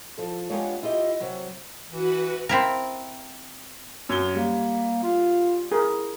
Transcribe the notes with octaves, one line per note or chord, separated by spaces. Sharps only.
F3 A4
G#3 B3 D4 F4 G4 C#5
E4 F4 G4 D#5
C3 F#3 F#4
E3 F#4 B4
C4 E4 A#4
F#2 G#6 G7
G3 A#3
F4
E4 G#4 A#4